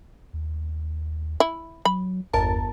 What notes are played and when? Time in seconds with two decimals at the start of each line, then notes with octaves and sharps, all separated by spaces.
0.33 D#2
1.40 E4
1.85 F#3 B5
2.33 G1 E2 A#4 A5